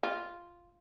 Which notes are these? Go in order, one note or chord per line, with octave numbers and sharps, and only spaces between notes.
F4